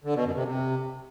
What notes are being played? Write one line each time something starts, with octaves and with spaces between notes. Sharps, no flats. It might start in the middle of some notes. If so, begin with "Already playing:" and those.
D3
B2
F#2
C3
C3